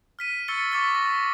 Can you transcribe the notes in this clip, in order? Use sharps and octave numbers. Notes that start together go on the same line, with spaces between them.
F6 B6 D#7
C#6 E6 A6 C#7 G7
C#6 D6 E6 A6 B6 G7
A#6